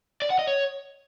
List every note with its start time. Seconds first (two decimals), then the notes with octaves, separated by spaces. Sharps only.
0.22 D5
0.30 F#5
0.39 D#5
0.47 C#5